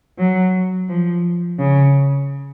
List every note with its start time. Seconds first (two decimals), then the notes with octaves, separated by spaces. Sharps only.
0.18 F#3
0.89 F3
1.59 C#3